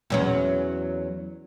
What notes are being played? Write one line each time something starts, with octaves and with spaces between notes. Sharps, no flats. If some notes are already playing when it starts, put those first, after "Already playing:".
E2 F#3 C#4